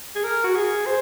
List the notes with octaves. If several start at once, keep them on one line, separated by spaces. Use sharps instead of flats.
G#4
A#4
F#4
G#4
C5